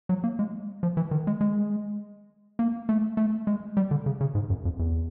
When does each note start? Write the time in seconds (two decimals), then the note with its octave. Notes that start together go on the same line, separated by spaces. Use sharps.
0.09 F#3
0.24 A#3
0.39 G#3
0.83 F3
0.97 E3
1.11 D#3
1.27 G#3
1.41 G#3
2.59 A#3
2.89 A3
3.17 A3
3.47 G#3
3.77 G3
3.91 D3
4.06 C#3
4.21 C#3
4.35 G#2
4.50 F#2
4.65 F2
4.79 E2